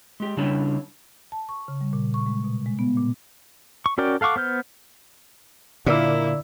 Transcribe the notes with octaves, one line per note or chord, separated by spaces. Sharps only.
G#3 G4
C#3 G3 D4 E4 C#5 A5
A5
C#6
C#3
G3
A#2
C#6
G#3
B2
G#3
B3
A#2
C#6
C#4 F#4 A#4 D5 G5
A4 F5 F#5 C#6 D6
B3 C5 F6 G6
A#2 D3 A#3 E4 D5 E6